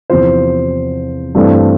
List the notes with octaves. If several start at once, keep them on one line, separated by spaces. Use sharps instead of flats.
E2 C3 F3 C5
G2 E3 A3 C4